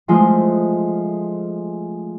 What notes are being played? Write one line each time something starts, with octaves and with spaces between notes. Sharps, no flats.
F3 G#3 A3 F4